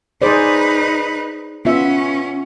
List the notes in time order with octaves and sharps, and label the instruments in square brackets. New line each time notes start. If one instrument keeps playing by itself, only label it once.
[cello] D#4 B4 [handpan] G#4 C5 D5
[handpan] B3 F4 E5 [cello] C#4